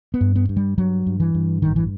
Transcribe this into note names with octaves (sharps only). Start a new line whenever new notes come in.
B3
G2
B3
G2
G3
G2 F#3
G2
E3
G2
A1 D#3
E3